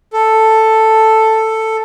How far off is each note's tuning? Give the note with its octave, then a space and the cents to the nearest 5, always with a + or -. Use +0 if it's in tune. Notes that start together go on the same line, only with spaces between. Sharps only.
A4 +5